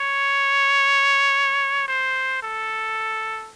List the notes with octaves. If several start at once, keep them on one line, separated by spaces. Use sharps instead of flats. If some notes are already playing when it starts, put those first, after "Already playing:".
Already playing: C#5
C5
A4